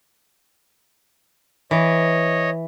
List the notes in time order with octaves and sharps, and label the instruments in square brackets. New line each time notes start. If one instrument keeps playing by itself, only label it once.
[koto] E3 [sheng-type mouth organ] C#5 D#5